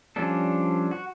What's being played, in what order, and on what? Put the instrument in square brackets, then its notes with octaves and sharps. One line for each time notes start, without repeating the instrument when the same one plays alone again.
[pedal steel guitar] F3 G3 C#4 D4 A4
F#4